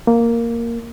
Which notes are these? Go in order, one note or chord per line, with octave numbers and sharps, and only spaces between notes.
A#3